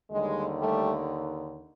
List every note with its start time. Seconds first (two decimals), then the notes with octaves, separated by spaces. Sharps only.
0.10 D#2 D3 G3 G#3
0.58 G3 A3